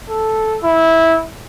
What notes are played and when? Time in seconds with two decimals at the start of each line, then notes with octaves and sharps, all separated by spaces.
0.10 A4
0.64 E4